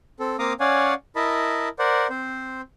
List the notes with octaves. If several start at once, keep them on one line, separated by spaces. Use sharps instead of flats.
C4 A4
A#3 C4 F5 A#5 D6 D#6
C#4 C#5 D5 F5 F#5 G#5
E4 A#4 D#5 A5 B5
A#4 C5 D5 F#5
C4 C5